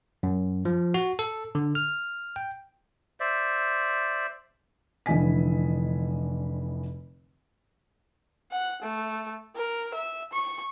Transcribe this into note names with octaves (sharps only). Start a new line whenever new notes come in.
F#2
F3
F#4
A4
D3
F6
G5
C5 D5 E5
F1 D3 E3 D#5 G#5 B6
F#5
A3
A#4
E5
C#6